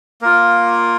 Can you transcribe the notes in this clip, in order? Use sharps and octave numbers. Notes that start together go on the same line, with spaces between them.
A#3 F4 A#4